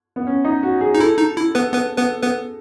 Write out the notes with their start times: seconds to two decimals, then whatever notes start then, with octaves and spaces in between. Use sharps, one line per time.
0.16 B3
0.27 C#4
0.45 D#4
0.63 F#4
0.81 G#4
0.95 D#4
1.00 E4 A4
1.18 D#4
1.37 E4
1.55 B3 B4
1.73 B3 B4
1.98 B3 B4
2.22 B3 B4